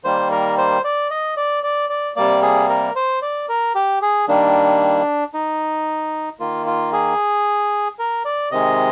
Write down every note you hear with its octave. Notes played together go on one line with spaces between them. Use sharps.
D#3 G3 A#3 C5
A#4
C5
D5
D#5
D5
D5
D5
C3 G3 A#3 D5
G#4
A#4
C5
D5
A#4
G4
G#4
D#3 G3 A#3 D4
D#4
D#3 A#3 F4
F4
G#4
A#4
D5
C3 D#3 G#3 D#5